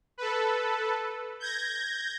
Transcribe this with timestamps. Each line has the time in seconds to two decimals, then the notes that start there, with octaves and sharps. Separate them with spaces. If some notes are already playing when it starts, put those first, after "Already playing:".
0.18 A4 B4
1.40 G6 G#6 A#6